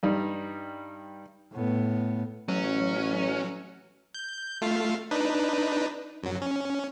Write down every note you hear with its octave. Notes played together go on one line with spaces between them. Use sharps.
G2 G3 D#4
A2 B3
A1 F#3 C#4
G6
A3 F4 F5
D4 D#4 B4
F#2 F#3
C#4